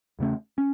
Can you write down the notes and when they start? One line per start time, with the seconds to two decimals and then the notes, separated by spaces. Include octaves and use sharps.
0.19 E2 C#3 A3 C#4
0.58 C#4